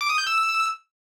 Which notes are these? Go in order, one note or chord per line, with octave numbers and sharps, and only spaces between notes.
D6
D#6
G6
E6